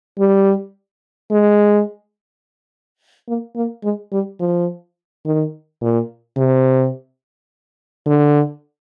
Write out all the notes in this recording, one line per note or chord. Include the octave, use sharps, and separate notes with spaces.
G3
G#3
A#3
A#3
G#3
G3
F3
D#3
A#2
C3
D3